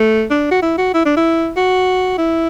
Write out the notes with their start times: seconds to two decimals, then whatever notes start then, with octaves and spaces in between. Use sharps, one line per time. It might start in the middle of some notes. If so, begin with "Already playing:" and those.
Already playing: A3
0.31 D4
0.51 F#4
0.62 E4
0.78 F#4
0.94 E4
1.06 D4
1.17 E4
1.57 F#4
2.18 E4